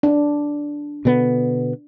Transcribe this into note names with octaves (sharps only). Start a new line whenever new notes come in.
D4
B2 D3 B3